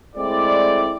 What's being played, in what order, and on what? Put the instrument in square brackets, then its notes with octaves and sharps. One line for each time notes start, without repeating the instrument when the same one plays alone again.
[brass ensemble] G#3 A3 C4 E4 D5